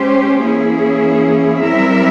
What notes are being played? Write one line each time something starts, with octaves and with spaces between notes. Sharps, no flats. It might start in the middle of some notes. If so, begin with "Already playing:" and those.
Already playing: G#3 C#4 G4 C5
E3 A#3 C#4 E4 G#4
G3 C4 E4 A#4 E5